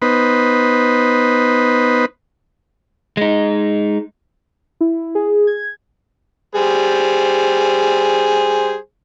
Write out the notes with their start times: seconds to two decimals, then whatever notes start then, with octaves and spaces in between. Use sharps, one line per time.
0.02 B3 D#4 B4 C5
3.17 G#3 D#4
4.81 E4
5.15 G#4
5.47 G#6
6.55 G3 G#4 C5